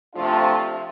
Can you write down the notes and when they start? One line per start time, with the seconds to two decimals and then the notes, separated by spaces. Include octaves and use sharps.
0.14 C3 F3 A3 D4 F4